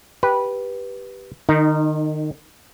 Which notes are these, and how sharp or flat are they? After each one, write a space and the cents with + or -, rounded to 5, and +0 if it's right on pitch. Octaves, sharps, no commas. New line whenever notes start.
G4 +0 B4 -10
D#3 -30 D#4 +0